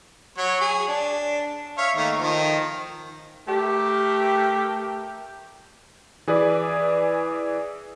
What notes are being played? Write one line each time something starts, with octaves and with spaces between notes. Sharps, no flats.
F#3 C#5
G#4
D4
C#5 E5 F5
D#3 A3 A#3
D#3 F3
A3 G4 A#4
E3 G#4 B4 D5